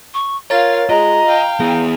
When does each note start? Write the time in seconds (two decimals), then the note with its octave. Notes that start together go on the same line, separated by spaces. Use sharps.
0.14 C#6
0.50 F4 A#4 C#5 F5 A#5 A6
0.90 G#3 F4 D#5 A#5
1.28 F5 G5
1.60 B3 E4 G#4 D#6